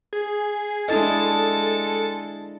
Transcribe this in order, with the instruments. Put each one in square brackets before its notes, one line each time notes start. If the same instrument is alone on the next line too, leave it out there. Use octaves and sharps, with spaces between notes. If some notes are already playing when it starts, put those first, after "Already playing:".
[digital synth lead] G#4
[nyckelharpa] G#3 A5 [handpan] D4 E4 D#5 [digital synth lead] A4